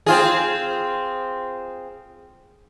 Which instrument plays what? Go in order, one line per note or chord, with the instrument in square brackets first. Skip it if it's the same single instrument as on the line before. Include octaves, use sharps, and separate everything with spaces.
[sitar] C4 F4 G#4